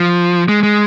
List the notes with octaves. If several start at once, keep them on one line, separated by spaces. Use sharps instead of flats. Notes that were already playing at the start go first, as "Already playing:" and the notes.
Already playing: F3
G#3
G#3